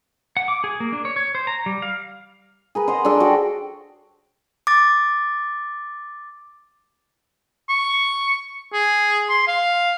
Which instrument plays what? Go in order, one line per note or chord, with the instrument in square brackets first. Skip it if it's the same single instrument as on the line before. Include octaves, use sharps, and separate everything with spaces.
[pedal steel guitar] F#5
D6
G#4
A#3
D4
C#5
C#5
C5
A#5
G3
F5
[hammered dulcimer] G#4 A#4 B4
C5 D#5 F#5 A#5
D4 G#4 A4 D5
F#4 G4 D5
[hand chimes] D6 A6
[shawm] C#6
G#4
C6
F5